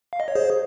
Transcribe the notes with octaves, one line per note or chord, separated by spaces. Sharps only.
F5
D#5
C#5
G#4 C5